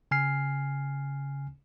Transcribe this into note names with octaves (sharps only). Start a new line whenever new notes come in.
C#3 G#5 F6 C7